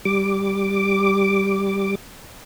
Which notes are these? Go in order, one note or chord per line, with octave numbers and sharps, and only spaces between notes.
G3 D6